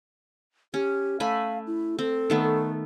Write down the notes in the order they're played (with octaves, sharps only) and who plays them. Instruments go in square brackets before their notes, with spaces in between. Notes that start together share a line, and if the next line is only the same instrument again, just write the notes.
[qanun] C#4 [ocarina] G4
[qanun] A3 G#5 B5 [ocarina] F5
[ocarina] E4
[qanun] C4 [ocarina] A4
[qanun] D#3 A3 B3